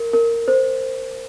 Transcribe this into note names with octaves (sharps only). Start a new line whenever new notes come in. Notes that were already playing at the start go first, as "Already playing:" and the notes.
Already playing: A#4
A#4
C5